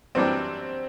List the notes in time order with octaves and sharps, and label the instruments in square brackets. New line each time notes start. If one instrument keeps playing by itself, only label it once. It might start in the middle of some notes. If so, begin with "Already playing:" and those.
[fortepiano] F#2 E3 G3 D4 G4 [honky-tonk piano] C4